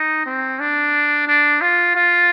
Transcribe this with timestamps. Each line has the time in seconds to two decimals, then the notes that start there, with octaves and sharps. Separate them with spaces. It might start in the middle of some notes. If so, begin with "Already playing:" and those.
Already playing: D#4
0.26 C4
0.60 D4
1.28 D4
1.61 F4
1.95 F4